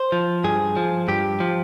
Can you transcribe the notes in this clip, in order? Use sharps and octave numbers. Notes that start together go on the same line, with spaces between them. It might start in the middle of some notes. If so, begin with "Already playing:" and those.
Already playing: C5
F3
G2 G#4
F3
G2 G4
F3